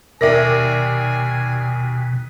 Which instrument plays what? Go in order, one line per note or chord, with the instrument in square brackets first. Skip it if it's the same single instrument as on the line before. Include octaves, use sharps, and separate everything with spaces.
[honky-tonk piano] D#2 D5 A#6 [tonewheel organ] B2 [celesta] A#4 E5 [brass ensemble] G#5